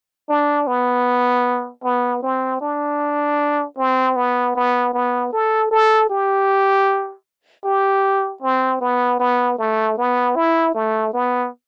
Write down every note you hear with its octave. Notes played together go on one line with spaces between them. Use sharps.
D4
B3
B3
C4
D4
C4
B3
B3
B3
A4
A4
G4
G4
C4
B3
B3
A3
B3
E4
A3
B3